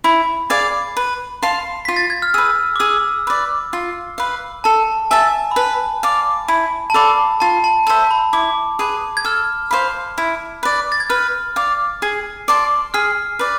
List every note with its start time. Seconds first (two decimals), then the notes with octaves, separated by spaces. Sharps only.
0.04 E4 B5
0.50 G#4 D5 F5
0.97 B4
1.43 F5 A5 C6
1.85 F4 B6
1.96 A6
2.10 G#6
2.22 F6
2.34 G#4 B4 E6
2.76 D6
2.80 G#4 E6
3.27 B4 D5
3.73 F4
4.18 B4 F5
4.64 A4 A5
5.11 E5 G#5 A5
5.51 B5
5.56 B4 A5
6.03 D5 F5
6.48 E4 B5
6.90 A5
6.94 A4 D5 F5 B5
7.40 F4 A5
7.64 A5
7.87 A4 C5 E5 A5
8.11 B5
8.33 E4 D6
8.79 G#4 B4
9.17 G#6
9.25 A4 F6
9.71 C5 F5 B5
10.18 E4
10.63 B4 D5
10.92 A6
11.00 G#6
11.10 B4 F6
11.56 D5 F5
12.02 G#4
12.48 D5 A5 C6
12.94 G#4 F6
13.39 B4 D5